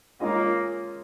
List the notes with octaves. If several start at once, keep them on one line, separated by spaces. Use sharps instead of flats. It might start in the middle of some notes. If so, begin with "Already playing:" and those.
G#3 A#3 C#4 F4 G#4 D#5